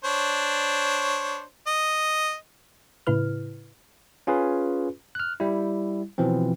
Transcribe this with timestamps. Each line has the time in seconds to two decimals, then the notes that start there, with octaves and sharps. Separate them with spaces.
0.04 D4 C5 C#5
1.67 D#5
3.07 A2 C#3 E4 B4 F6
4.27 C#4 F4 G#4 B4
5.15 F6 F#6
5.40 G3 E4
6.18 B2 E3 F3 C4